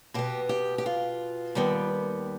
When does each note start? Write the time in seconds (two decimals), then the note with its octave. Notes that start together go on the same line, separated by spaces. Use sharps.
0.14 B2 B3 G4
0.49 G4
0.78 G4
0.86 F4
1.55 D#2 D#3 G3 B3